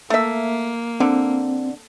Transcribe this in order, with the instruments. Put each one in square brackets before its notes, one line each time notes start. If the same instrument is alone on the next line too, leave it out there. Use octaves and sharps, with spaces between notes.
[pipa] A3 E5 [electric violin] A#3
[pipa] D3 [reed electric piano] C4